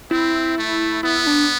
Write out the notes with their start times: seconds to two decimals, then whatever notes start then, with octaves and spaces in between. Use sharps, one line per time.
0.11 C4 E4
0.58 A3
1.03 B3 E4
1.27 D4